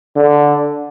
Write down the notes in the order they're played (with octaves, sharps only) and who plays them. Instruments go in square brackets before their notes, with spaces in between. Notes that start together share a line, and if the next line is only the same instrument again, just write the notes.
[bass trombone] D3